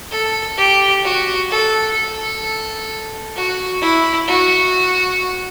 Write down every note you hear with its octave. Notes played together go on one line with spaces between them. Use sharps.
A4
G4
F#4
A4
A4
F#4
E4
F#4